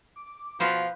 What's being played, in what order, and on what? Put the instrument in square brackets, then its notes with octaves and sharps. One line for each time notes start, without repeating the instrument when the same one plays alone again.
[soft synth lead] D6
[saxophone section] B2 F3 [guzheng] F4 B4 C5 [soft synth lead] F5